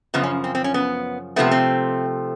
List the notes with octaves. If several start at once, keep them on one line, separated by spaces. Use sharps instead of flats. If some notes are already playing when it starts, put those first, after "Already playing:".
F#2 C#3 F3 B3
C#4
C4
C4
C#4
B3
C3 F3 A3 B3
C4